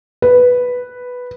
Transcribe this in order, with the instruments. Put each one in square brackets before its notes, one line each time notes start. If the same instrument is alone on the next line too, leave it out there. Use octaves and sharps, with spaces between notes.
[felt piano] B4